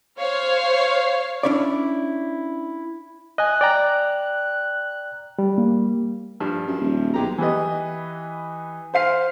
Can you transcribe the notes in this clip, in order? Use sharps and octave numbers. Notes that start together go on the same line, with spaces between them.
C5 C#5 F5
C#4 D4 E4 C#5 D5
D#5 G#5 F#6
D5 G5 A#5
G3
A#3
G2 F3
F#2
D#1
B1 G#3 G4 A#5
E3 G4 B4 D#5
C5 F5 C7